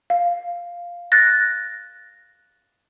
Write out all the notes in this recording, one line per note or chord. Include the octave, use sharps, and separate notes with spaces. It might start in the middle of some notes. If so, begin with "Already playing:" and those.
F5
F#6 A6 A#6